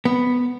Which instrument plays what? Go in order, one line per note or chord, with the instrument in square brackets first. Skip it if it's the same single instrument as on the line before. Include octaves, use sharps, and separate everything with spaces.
[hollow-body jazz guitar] B3